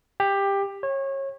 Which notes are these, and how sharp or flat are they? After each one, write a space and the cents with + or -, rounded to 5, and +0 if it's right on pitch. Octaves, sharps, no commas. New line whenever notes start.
G4 +15
C#5 -25